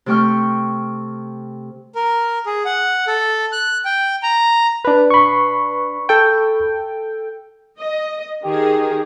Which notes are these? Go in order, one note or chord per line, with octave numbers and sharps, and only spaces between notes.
C3 A3 G4 G5 C#6 F6
A#4
G#4
F#5
A4
F#6
G5
A#5
D4 B4
B5 C#6
A4 G5
D#5
D#3 G4 G#4